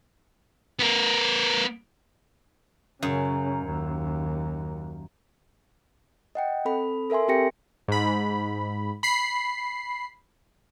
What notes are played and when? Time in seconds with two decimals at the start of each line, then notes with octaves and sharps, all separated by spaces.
0.79 B3 A#4
3.03 F#2 C#3
3.66 D#2
6.35 D#5 F#5 G5
6.65 C4 A4 B5
7.10 A4 A#4 E5 G#5 C6
7.28 C4 G4 A#4 G5 A#6 C#7
7.88 G#2 B5
9.03 B5 C7